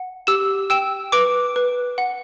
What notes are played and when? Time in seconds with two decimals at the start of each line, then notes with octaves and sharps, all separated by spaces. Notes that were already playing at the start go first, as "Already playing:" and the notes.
Already playing: F#5
0.27 G4 E6 E7
0.70 G5 E6 E7
1.12 B4 D6 D7
1.56 B4
1.98 F#5